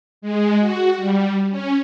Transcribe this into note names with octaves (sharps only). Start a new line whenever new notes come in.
G#3
F#4
G3
C#4